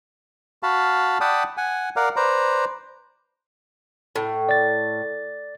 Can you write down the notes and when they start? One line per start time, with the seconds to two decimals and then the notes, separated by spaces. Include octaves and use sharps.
0.63 F#4 F5 A5 B5
1.21 D5 F#5 G5 A5 B5 D#6
1.57 F#5 G#5
1.96 A#4 D5 F5 F#5
2.16 B4 C5 D5 A#5
4.16 A2
4.49 D5 A6